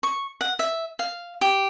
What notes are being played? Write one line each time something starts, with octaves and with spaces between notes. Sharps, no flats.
C#6
F#5
E5
F5
G4